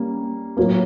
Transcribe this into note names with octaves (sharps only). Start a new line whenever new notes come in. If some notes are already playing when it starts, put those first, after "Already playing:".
Already playing: G3 A#3 C#4
A2 F#3 A#3